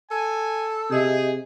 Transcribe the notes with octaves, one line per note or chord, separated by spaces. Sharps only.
A4 G#5
C3 G4 G#4 D#5 E5